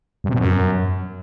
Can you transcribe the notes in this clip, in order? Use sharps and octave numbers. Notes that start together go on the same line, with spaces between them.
G2
C3
B2
F#2